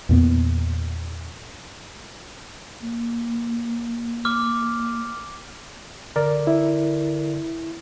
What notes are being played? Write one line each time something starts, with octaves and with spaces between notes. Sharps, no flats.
E2 A#2 B3
A#3
D6 F6
D3 A#4 D5
E4